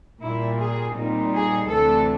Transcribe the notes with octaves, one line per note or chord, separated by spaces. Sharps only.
A#2 G3 A#3 E4
G#4
A#2 G3 C4 D#4
G#4
D2 C3 E3 A3 D4 A4